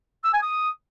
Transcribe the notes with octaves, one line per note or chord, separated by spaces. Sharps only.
E6
G#5
D#6